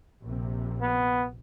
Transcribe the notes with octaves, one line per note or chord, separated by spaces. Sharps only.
A#1 C3
B3